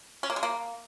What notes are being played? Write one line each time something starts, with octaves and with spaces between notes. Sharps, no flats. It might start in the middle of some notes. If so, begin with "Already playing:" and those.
C#4
A#3
G#3
A#3